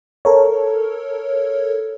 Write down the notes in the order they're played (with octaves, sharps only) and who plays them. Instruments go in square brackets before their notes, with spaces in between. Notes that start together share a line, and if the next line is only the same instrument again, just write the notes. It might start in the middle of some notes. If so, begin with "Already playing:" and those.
[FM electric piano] A4 A#4 C#5